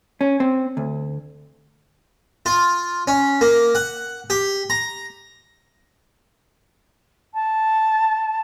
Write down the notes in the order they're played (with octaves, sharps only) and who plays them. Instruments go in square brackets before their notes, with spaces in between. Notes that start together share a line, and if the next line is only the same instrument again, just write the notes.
[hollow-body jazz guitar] C#4
C4
D2
[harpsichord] F4
C#4
A#3
F#5
G4
A#5
[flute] A5